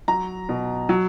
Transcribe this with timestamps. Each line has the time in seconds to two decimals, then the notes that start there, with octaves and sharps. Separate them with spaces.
0.08 F#3 A#5
0.49 B2
0.89 F#3